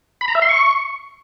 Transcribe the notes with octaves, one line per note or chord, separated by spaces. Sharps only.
B5
A#5
E5
C6
C#6